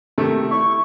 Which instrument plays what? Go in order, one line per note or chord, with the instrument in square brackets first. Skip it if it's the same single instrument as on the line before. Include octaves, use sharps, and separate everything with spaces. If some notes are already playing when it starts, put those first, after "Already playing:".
[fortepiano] C3 D#3 A3
[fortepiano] E4 [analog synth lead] C#6